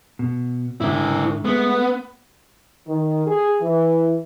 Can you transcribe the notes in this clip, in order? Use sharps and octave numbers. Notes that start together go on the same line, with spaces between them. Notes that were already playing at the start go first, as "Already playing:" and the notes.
B2
G#2 D3 E4 A#4
G#3 A3 B3
D#3
G#4
E3